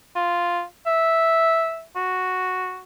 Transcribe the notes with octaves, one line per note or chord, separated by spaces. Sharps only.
F4
E5
F#4